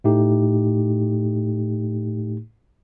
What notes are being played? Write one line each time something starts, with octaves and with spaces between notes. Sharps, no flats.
A2 A3 D#4 G4